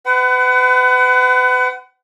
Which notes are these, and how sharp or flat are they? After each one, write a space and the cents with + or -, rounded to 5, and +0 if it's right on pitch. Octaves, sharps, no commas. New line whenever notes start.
B4 +40 F#5 +25